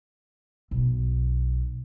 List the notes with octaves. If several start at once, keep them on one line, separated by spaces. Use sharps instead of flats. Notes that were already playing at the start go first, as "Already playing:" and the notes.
B1